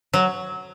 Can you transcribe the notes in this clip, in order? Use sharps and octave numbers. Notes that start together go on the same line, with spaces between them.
F#3